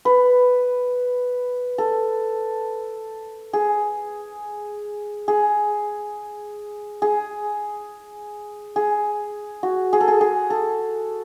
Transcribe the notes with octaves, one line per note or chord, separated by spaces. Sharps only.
B4
A4
G#4
G#4
G#4
G#4
F#4
G#4
A4
G#4
G#4
A4